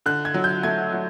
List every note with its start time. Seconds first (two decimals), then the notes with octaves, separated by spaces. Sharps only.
0.06 D3 F#6
0.25 G#6
0.34 F#3
0.44 G6
0.63 A3 G#6
0.93 F#3